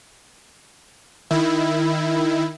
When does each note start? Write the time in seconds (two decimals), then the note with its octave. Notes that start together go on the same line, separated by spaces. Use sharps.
1.31 D#3 E4